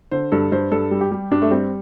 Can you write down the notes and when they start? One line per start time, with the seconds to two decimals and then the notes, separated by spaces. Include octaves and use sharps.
0.11 D3 C5
0.32 G2 A4
0.52 G2 C5
0.72 G2 A4
0.91 G3
1.01 G4
1.11 G3
1.31 G2 D4
1.42 A3
1.51 G3 C4